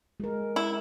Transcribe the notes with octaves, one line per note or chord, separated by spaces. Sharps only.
G#3 A#4
E4